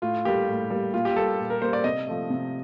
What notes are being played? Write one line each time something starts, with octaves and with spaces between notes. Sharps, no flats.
A2 F4
G3 A#3 G4
A2
G3 A#3
A#2 F4
G4
G3 A#3 A4
A#2
A#4
G3 A#3 C5
D5
C3 D#5
F3 A3
C3